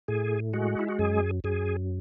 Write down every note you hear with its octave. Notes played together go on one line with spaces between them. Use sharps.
A2 G#4
G#3 F#4
E4
F#4
F#2 G#4
F#2 G#4